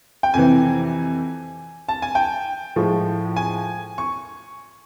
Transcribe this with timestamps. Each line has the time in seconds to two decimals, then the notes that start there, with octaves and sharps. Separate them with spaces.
0.23 G5
0.34 F2 C3 E3 G#5
1.89 A5
2.02 G#5
2.15 G5
2.76 A2 F3 G#3
3.36 G#5
3.98 C#6